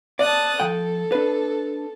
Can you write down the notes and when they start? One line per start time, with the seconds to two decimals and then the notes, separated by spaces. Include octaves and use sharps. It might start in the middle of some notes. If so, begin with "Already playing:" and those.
0.19 D5 A5 D#6 F#6
0.60 F3 A4 G5
1.12 D4 B4